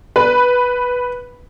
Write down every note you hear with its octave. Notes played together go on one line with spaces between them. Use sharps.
B4